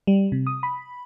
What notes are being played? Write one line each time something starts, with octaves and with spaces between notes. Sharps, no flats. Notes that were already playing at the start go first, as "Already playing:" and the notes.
G3
C3
D#6
B5